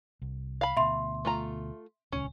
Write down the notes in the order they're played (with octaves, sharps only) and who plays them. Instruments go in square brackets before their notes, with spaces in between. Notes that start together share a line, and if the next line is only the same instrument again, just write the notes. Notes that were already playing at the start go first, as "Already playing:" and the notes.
[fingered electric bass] C2
[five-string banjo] F5 B5
[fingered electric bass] D2 B2 [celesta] E5 C6
[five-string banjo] A3 F4 A#5
[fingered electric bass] D#1 C#2 [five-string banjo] C#4